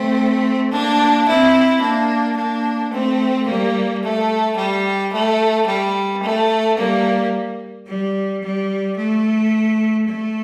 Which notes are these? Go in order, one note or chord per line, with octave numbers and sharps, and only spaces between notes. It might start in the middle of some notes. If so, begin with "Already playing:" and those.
Already playing: A3 C4
A#3 D4
C4 E4
A#3 D4
A#3 D4
A3 C4
G3 A#3
A3
G3
A3
G3
A3
G3 A#3
G3
G3
A3
A3